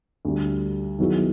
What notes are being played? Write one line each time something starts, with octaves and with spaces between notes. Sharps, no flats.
D2 D3 G3
D#3 F#3 B3 E4 G#4